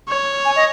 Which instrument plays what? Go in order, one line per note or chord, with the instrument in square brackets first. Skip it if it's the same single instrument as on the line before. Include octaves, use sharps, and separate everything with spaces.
[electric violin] C#5
[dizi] G#5
D#5